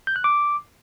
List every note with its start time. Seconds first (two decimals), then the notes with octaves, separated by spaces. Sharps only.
0.07 G6
0.16 F#6
0.24 D6